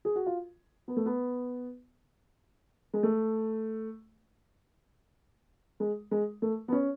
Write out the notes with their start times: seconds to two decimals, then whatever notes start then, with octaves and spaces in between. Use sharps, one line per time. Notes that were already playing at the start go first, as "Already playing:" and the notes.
0.05 G#4
0.16 F#4
0.26 F4
0.88 B3
0.97 A3
1.06 B3
2.94 G#3
3.03 A3
5.80 G#3
6.11 G#3
6.42 A3
6.68 B3
6.72 C#4